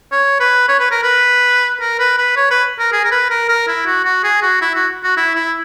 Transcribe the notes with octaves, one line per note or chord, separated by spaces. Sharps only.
C#5
B4
C#5
B4
A#4
B4
A#4
B4
B4
C#5
B4
A#4
G#4
A#4
B4
A#4
A#4
E4
F#4
F#4
G#4
F#4
E4
F#4
F#4
E4
E4